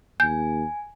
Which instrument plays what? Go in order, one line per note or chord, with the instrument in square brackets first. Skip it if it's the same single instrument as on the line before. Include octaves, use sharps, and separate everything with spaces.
[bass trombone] D#2 [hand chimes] G#5 [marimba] G6